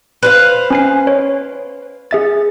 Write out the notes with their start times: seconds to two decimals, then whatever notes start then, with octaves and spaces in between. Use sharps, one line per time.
0.23 B4 C5 F5
0.70 C#4 G#5 C7
1.07 C#5
2.11 G#4 E5 A6